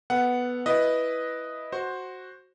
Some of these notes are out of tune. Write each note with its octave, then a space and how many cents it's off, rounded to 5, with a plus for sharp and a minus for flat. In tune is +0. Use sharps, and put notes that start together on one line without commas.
B3 +0 A4 +0 F#5 +0
E4 +0 B4 +0 D#5 +0
F#4 +0 C5 +10